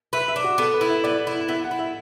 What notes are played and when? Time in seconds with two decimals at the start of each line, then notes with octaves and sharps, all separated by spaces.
0.13 B4 E5
0.28 E5
0.36 D4
0.44 F#4
0.58 B3 A4
0.74 B4
0.81 E4
0.89 E5
1.04 B3 D5
1.27 E4
1.48 B3 E5
1.64 F#5
1.71 E4
1.79 E5